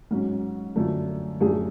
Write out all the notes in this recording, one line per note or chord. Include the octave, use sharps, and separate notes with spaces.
G#2 F#3 C#4
F#2 D3 F3 A3
F#2 F3 A3 D4 G#4